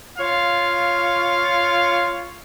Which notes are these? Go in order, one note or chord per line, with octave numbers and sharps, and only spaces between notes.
F4 C#5 F5